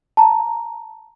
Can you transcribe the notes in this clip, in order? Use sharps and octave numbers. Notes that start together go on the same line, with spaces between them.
A5 A#5